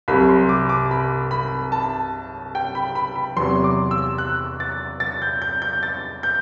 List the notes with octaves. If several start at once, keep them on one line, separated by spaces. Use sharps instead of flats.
C2 C3 F#3 B5
C6
D6
D6
B5
B5
A5
G5
B5
B5
B5
E2 C3 F#3 C6
D6
E6
F#6
A6
A6
G6
G6
G6
A6
G6